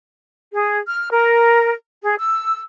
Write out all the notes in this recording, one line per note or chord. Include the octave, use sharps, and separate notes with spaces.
G#4
F6
A#4
G#4
E6